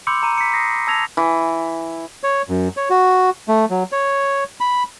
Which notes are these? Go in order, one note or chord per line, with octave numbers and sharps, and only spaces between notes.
B5 C6 D6 E6 G6 C#7
A#5 D#7
B6 C#7
D#6 A#6 C7
A5 E6 G#6 A#6 F7
E3
C#5
F#2
C#5
F#4
A3
F#3
C#5
B5